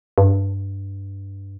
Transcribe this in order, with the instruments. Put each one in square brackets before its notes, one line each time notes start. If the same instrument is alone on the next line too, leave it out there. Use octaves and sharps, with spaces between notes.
[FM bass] G2